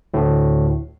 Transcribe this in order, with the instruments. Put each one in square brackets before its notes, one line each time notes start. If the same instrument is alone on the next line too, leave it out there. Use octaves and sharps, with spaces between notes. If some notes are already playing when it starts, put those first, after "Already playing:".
[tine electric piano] D2 A2